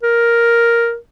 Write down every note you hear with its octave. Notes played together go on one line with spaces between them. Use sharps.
A#4